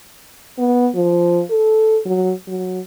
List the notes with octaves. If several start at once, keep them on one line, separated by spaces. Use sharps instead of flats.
B3
F3
A4
F#3
F#3